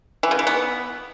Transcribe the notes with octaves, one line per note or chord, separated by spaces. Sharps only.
E3
C#3
E3
B3